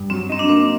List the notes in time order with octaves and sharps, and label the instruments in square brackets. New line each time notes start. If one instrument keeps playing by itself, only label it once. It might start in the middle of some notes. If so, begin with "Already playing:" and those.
Already playing: [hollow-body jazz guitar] G2
[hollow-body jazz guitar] F#3 [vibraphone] C4
[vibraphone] C4 [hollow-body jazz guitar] D#4
[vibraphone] D4
[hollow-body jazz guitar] A#3 [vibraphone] C4